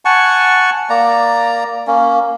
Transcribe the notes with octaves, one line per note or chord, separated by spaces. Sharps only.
F#5 G#5 A5 C#6
A#3 D5 A#5
A#3 C#4